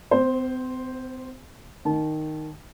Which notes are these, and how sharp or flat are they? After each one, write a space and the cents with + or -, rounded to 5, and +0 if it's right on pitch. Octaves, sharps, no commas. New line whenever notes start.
C4 -40 C5 +0
D#3 -5 A5 -30